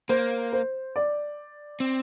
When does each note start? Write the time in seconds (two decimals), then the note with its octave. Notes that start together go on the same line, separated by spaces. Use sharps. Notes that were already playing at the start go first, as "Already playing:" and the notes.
0.09 A#3 C5
0.53 C5
0.96 D5
1.80 C4